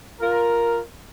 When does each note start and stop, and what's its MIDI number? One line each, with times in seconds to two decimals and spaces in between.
0.21 0.78 65
0.21 0.78 70